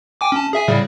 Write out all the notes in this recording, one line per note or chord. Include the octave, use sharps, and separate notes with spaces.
G5 G#5 D6
C#4 A5
G#4 E5 G#5
A2 C#3 G3